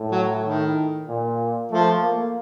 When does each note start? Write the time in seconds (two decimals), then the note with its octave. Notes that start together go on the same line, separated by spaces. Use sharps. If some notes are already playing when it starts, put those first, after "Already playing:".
Already playing: A2
0.11 F#3
0.43 D#3
1.08 A#2
1.71 F3 A3
2.03 A#3